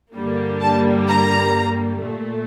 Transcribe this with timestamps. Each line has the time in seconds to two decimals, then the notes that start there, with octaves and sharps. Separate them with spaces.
0.15 G2 D3 G3 A#3
0.61 A5
1.08 A#5
2.01 A#2 A3